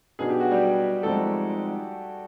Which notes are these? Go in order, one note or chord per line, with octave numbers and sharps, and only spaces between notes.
B1 B2 F#3 B3 D4 G#4
G4
F#4
G3 G4
G#1 G#2 F3 G#3 A3 C4 A4